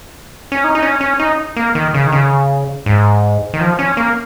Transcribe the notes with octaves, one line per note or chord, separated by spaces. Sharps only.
C#4
D#4
D#4
C#4
C#4
D#4
A#3
D#3
C#3
D#3
C#3
G#2
D#3
F3
C#4
A#3